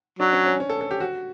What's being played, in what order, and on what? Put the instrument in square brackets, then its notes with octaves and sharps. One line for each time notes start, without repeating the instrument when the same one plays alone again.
[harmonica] F#3 [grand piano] D4
[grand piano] C#4
C#4
C#4
A4
A4
G4
F#4